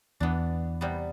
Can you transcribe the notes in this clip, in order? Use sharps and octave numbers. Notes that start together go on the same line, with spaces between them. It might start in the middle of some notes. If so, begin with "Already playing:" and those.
E2 E3 B3 D4
C3 G3 B3